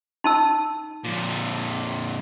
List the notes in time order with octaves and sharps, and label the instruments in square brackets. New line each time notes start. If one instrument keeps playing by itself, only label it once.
[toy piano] D#4 A5 E6
[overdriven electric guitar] F2 A#2